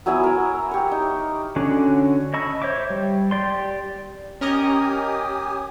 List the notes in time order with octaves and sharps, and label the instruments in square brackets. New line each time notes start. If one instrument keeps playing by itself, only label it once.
[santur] F#3 B3 E4 G#5
A#4
G4 C#5
D#4
[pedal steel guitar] D3 C#4 F#4 D6
D#5 A5 B5 C#6 E6
C5 C#5 E5 D6
G3
G4 D5 C6
[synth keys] C#4 A#4 D#5 [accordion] G4 G#5 D#6